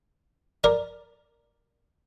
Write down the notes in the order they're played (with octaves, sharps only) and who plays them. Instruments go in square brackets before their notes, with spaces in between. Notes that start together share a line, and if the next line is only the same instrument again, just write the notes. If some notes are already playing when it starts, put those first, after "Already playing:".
[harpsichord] A#4 D5